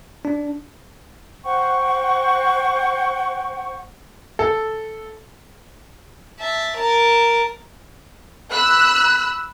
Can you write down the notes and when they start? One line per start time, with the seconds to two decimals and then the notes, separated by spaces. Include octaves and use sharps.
0.25 D4
1.44 C5 F#5 G5 C#6
4.39 A4
6.40 E5 A5
6.78 A#4 A5
8.52 B5 E6 F#6